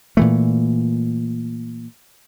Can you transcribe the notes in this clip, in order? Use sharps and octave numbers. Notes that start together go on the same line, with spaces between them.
A#2 E3 A3